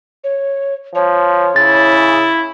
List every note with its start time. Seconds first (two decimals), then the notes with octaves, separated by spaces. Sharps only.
0.24 C#5
0.95 F3 C#5
1.56 C#3 E4 A6